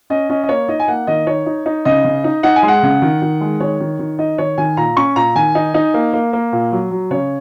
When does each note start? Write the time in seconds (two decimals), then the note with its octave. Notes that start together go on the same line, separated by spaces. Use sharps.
0.10 C#4 D#5
0.30 C#4 D#5
0.43 D#5
0.49 A#3 C#5
0.68 D#4 D#5
0.80 G#5
0.88 A#3 F#5
1.07 D#3 D#5
1.27 D#4 C#5
1.46 D#4
1.66 D#4
1.85 C#3 D#5
2.05 C#3
2.24 D#4
2.43 D#4 F#5
2.56 G#5
2.63 G#3
2.68 F#5
2.83 C#3
3.02 D#3
3.22 D#3
3.41 G#3
3.60 D#3 C#5
3.80 D#3
3.99 D#3
4.19 D#4 D#5
4.38 D#3 C#5
4.58 D#3 G#5
4.77 A#2 A#5
4.97 C#4 C#6
5.16 A#2 A#5
5.35 D#3 G#5
5.55 D#4
5.74 D#4
5.94 A#3
6.13 A#3
6.33 A#3
6.53 A#2
6.72 F#3
6.91 F#3
7.11 C#3 C#5